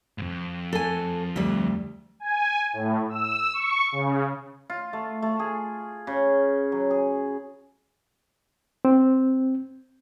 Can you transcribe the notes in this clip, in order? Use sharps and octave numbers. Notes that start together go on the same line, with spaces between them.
F2 G#2
A4 G#5
D2 G3
G#5
A2
E6
C#6
C#3
F4
A3
A3
G#4
C#3
F#3
G#4
C4